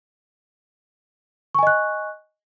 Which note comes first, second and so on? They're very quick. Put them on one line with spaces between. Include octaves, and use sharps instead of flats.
C#6 G#5 D#5 F#6